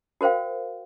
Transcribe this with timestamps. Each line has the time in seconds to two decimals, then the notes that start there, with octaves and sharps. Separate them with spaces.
0.21 F#4 A#4 C5 F5 G5